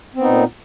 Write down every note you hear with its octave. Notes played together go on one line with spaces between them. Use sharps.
A#2 B3 C4 D#4